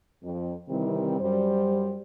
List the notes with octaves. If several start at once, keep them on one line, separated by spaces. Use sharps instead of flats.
F2
C3 D#3 E3 G3 C4 E4
F#2 G3 C5